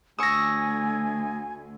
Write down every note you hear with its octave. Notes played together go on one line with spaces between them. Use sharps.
D2 G#5 C#6 D#6 E6 A#6